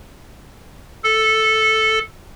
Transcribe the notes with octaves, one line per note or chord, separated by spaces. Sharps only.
A4